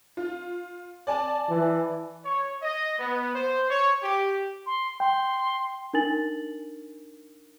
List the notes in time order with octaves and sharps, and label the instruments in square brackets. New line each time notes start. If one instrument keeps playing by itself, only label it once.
[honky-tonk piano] F4
D5 G#5 A5
[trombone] E3
[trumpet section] C#5
D#5
B3
C5
C#5
G4
[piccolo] C6
[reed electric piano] G5 [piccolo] C6
[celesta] D4 D#4 A#4 G#5 A6 F#7